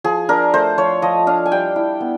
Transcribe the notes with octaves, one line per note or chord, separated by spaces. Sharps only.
F3 G#4
D4 A#4
A3 C5
F3 C#5
F3 D#5
D4 F5
G#5
G3 G5
E4
B3